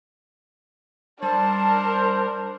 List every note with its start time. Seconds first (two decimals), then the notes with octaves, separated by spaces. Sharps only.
1.23 G3 D4 A#4 C5 A5